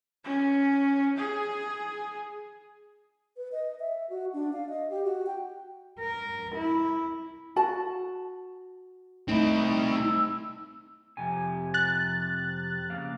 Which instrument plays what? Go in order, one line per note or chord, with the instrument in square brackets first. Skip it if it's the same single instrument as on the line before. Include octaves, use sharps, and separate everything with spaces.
[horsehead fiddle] C#4
G#4
[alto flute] B4
D#5
E5
F#4
D4
F5
D#5
G4
F#4
G5
[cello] A#4
E4
[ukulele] F#4 A5
[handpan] A3 D#4 [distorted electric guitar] C4 E4
[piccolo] E6
[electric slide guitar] F2 C3 G#5
[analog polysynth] F#6 A6
[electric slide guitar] C#3 A#3 F5